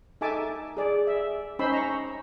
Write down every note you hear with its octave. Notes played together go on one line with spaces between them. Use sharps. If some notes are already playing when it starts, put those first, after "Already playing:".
D#4 A4 E5 G#5 A5 D6
G#4 D5
E5
C#4 D#4 C5 B5 C6 E6
A#5 C#6